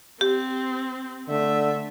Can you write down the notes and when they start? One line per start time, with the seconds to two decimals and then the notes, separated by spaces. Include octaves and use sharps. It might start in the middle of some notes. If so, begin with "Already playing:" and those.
0.21 C4 G4
1.28 D3 A3 E5